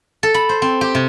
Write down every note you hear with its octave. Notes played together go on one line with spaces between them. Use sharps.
A4
B5
C5
C4
G4
C3